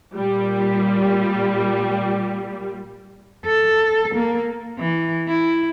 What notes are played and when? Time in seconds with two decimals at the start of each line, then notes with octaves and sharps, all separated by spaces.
0.14 A#2 G3
3.46 A4
4.15 A#3
4.78 E3
5.27 E4